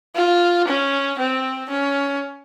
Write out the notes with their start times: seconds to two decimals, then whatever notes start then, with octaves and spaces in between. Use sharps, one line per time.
0.16 F4
0.68 C#4
1.19 C4
1.70 C#4